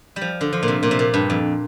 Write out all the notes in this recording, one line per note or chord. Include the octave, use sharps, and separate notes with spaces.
G3
F3
D3
F3
A#2
C3
A#2
C3
A#2
G2
F2